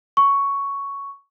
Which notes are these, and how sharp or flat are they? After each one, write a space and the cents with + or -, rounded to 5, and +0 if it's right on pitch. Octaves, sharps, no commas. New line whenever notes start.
C#6 +5